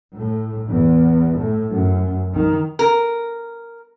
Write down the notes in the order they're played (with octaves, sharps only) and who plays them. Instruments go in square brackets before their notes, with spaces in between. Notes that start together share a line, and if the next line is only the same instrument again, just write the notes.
[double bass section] A2
E2
A2
F#2
D#3
[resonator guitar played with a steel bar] A#4